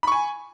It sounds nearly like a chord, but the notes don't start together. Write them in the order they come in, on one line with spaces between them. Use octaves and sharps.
B5 C#6 G#5